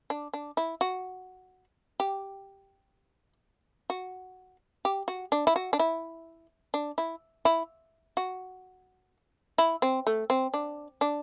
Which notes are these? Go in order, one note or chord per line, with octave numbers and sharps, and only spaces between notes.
D4
D4
E4
F#4
G4
F#4
G4
F#4
D4
E4
F#4
D4
E4
D4
E4
E4
F#4
E4
C4
A3
C4
D4
D4